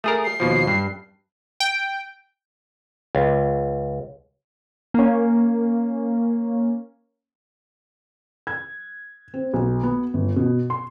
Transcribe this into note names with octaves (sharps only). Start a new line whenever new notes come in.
A3 G#4 A#4 D#6
C7
D#2 B2 F3
G2
G5
C#2
A#3 C#4
G#6
C4
B1
B3
G1
B2
C6